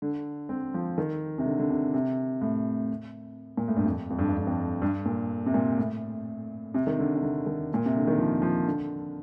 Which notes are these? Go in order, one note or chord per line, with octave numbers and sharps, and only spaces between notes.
D3
C4
F3
D#3
C3
D3
D3
C3
C3
A2
A#2
A2
G2
F2
F2
G2
F2
G2
F2
G2
A#2
C3
A#2
A2
C3
D#3
D3
C3
D3
D#3
A#2
C3
D3
D#3
F3
F3
D3